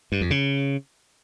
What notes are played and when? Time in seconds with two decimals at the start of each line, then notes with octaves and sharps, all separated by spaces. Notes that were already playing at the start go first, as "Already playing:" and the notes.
0.12 G2
0.21 F2
0.31 C#3